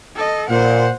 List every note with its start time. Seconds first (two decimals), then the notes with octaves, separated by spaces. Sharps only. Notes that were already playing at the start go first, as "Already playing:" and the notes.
0.16 A4 D#5
0.50 A#2 C5 F#5